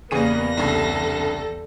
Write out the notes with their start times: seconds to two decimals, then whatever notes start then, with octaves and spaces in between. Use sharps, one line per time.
0.11 E2 C#3 G3 A#3 B3 G#4 A#6 D#7
0.57 C2 G2 C#3 A4